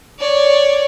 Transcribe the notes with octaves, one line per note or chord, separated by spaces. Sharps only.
C#5 D5